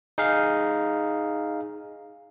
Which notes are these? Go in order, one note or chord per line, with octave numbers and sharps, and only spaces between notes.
D#4 G#4 F5